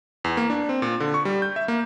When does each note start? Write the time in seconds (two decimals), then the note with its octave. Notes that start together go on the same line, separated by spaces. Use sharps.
0.24 E2
0.37 A#3
0.50 D4
0.69 C4
0.82 A#2
1.00 D3
1.14 C#6
1.25 G3
1.42 G6
1.56 E5
1.68 A#3